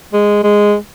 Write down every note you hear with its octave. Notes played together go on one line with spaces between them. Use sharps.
G#3
G#3